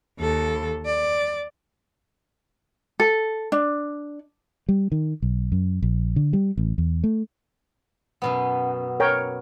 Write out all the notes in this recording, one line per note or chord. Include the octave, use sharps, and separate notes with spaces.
D#2 A4
D5
A4
D4
G3
D#3
B1
F#2
A#1
D3
G3
A1
E2
A3
F#2 B2 B3
A#4 C#5 G5